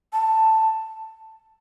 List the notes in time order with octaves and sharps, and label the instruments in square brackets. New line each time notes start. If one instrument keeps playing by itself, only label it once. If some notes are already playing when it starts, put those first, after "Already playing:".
[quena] A5